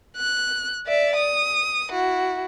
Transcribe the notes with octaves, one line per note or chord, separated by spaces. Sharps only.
F#6
D5 E5
D#6
E4 F#4